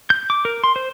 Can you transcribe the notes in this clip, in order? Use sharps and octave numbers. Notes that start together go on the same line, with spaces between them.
G6
D6
A#4
C6
C5